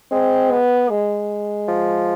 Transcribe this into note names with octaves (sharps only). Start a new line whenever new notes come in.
G#3 C4
B3
G#3
F3